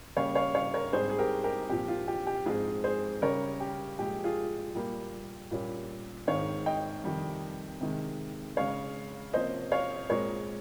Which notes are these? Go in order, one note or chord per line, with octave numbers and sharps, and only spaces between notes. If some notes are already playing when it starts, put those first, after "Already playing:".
C#3 G3 A#3 C#4 C#5 F5
C#5 F5
C#5 F5
A#4 C#5
G#2 G3 C4 G#4 C5
G#4
G4 A#4
G4 A#4
A#2 F3 C4 G4
F4
G4
G4
G#2 F3 G#3 C4 F4 G#4
G#4 C5
C#3 G3 C#4 A#4 C#5
G4
A#2 F3 G#3 G4
F4 G#4
A#2 G3 A#3
A#2 G3 A#3 C#4
G#2 D#3 G#3 C4 C#5 F5
D#5 G5
F2 C3 D#3 G3
C3 D#3 G#3
C#3 G#3 C#4 C#5 F5
C3 F3 A#3 C#4 C5 D#5
C#5 F5
A#2 G#3 C4 A#4 C#5